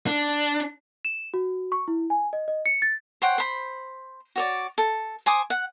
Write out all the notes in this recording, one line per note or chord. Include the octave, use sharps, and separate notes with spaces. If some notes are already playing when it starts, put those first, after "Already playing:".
D4
E7
F#4
C#6
E4
G#5
D#5
D#5
C#7
A6
C5 C#5 F#5 G5
C5 B5
F#4 C#5 D5
A4
C5 G#5 D6 D#6
F#5